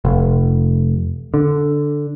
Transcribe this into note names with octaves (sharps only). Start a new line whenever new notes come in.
F1
D3